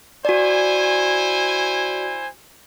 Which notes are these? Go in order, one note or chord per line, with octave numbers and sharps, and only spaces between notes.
E4 F#4 C5 D5 G#5